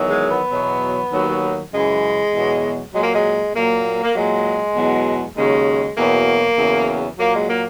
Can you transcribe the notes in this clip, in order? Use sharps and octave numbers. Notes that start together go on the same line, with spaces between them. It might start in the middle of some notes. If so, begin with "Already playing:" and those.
Already playing: E2 D#3 F#3
G#3
B3
E2 B2 F#3
D#2 D#3 F#3
F#2 C#3 E3 G#3
E2 B2 F#3
A#2 F#3 G#3
A#3
G#3
A#2 F#3 A#3
A#3
A#2 F#3 G#3
E2 B2 F#3
D#2 C#3 F#3 G#3
E2 B2 F#3 A#3
E2 C#3 F#3
A#2 F#3 A#3
G#3
A#3